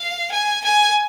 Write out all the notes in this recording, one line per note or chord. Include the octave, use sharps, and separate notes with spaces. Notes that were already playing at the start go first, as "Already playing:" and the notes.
Already playing: F5
G#5
G#5